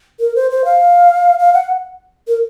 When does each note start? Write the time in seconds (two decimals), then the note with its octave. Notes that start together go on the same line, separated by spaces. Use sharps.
0.20 A#4
0.36 C5
0.51 C5
0.65 F5
1.39 F5
1.53 F#5
2.28 A#4